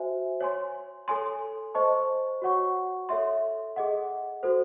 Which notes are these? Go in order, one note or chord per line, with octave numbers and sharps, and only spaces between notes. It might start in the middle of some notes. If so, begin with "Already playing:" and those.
Already playing: F#4 C5 E5 G#5
C#5 G#5 C6
A4 C#5 G#5 C6
C5 D#5 A5 C#6
F#4 C#5 F#5 C#6
A4 C#5 E5 C6
G#4 D#5 F#5
F#4 A4 C5